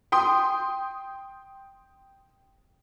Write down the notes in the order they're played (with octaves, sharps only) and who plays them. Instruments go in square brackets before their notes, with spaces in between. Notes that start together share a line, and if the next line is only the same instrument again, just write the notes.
[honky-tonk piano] G5 C6 D#6